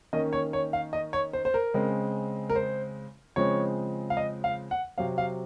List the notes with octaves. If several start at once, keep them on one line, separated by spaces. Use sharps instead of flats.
D#3 A#3 C#4 D#5
C#5
C#5
F5
D#5
C#5
C5
C5
A#4
C#3 G#3 C4
A#4
C5
C#3 F3 G#3 C4 C#5
F5
D#5
F5
F#5
C3 F#3 C4 F5
F5